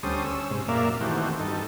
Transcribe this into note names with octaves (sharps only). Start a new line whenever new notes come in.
D2 G3 C#4 A4 C5 D#6
C#4 E6
G#2 C3
F#2 A#2 A#3 D5 E5 F5
D#3 E3 A3 C4 F#4 G4
G2 D#4 A4